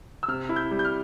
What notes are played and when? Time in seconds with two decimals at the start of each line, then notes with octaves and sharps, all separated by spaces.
0.23 E6
0.28 C3 F6
0.49 E4
0.56 G6
0.71 G3
0.79 G6
0.85 F6